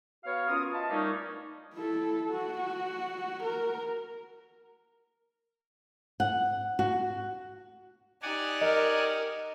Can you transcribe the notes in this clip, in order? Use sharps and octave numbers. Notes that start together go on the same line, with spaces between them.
B3 F#4 C#5 F5
B3 C#4 F4 A#4 D#6
F4 D#5 E5 A5
A#2 G3 A3 A#3 C#4 D#4
E4 A4
F#4
A#4
F#5
F#4
D#4 G4 D5 F#5 G#5
A#4 D#5